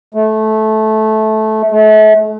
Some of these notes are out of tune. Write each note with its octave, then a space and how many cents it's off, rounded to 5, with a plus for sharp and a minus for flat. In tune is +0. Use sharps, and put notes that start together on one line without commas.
A3 -15
A3 -35